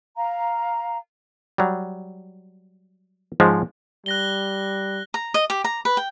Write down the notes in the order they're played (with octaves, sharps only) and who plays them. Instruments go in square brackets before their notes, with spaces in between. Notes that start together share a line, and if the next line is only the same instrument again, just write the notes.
[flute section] F5 A#5
[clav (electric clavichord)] F#3 G3
G#2 F3 G#3 C#4
[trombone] G3 [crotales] F#6 A#6 G7
[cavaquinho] A#5
D#5
G4
A#5
B4
G5